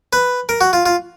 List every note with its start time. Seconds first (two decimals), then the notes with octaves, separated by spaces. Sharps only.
0.13 B4
0.49 A#4
0.61 F#4
0.73 F4
0.86 F4